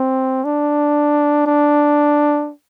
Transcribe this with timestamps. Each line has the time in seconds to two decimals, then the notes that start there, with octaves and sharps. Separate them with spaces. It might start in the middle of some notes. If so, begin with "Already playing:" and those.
Already playing: C4
0.44 D4
1.46 D4